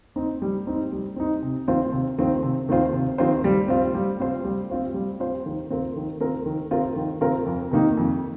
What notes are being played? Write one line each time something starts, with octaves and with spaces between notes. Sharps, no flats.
C4 D#4
G3
C4 D#4
G3
C4 D#4
C3
D#3 C4 F4 C5
C3
D#3 C4 F4 C5
C3
D#3 C4 F4 C5
C3
D#3 C4 F4 C5
G3
C4 F4 C5
G3
C4 F4 C5
G3
C4 F4 C5
G3
C4 F4 C5
D#3
C4 F4 A#4
D#3
C4 F4 A#4
D#3
C4 F4 A#4
D#3
C4 F4 A#4
F2
C3 D#3 A#3 D#4
F2